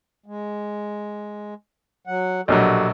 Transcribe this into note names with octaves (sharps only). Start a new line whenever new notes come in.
G#3
F#3 F#5
A#1 B2 F#3 F#4 G4 A4